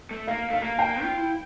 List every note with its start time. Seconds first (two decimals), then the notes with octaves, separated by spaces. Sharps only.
0.11 A3
0.27 A#3 F5
0.50 A3 F5
0.62 A#3
0.79 A#3 G5
1.03 F4
1.17 E4